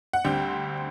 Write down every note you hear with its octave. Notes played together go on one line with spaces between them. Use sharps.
F#5
D2 D3 G3 C4 G5